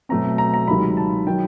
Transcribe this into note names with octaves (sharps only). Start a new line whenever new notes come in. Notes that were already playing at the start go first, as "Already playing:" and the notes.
B2 F#3 A3 C4 A#5
A#5
A#5
C#2 C3 D#3 F#3 B5
A5
D#3 F#3 G5